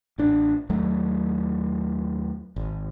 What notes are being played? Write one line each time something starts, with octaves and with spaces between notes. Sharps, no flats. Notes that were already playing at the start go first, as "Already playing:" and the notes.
A1 D4
D#2 F#3 A3
G#1